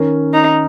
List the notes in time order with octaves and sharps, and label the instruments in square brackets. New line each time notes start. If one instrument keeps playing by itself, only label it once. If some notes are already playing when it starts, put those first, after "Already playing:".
Already playing: [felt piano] D#3 C#4 A#4
[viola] D#4